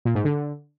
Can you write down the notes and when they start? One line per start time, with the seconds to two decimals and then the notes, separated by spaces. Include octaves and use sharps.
0.05 A#2
0.15 G#2
0.25 D3